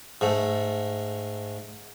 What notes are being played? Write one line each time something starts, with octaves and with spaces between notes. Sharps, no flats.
G#2 A3